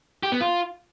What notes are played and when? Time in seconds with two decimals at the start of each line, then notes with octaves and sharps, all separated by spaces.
0.23 G4
0.32 B3
0.41 F4